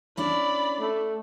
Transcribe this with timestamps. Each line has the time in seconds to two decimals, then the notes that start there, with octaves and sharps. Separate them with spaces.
0.17 C#4 D4 E4 D5 B5
0.79 A3